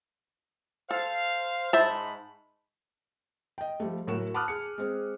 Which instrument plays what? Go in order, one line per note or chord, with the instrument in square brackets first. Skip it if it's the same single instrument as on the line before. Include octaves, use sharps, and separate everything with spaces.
[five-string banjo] A4 [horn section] C5 F5
[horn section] G#2 B5 [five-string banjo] C5 E5 A5
[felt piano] D#5 G5
F3 G3 A3
A2 F#3 F#4 A#4 E7
A5 B5 D6 D#6 F6 F#6
G#4 C#7
G#3 C4 G#4